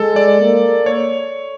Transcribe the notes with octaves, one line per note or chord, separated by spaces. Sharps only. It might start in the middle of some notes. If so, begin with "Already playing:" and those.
Already playing: G#3 A4
D5
A#3
C#5